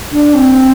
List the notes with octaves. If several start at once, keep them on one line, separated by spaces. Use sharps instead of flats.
D4
C4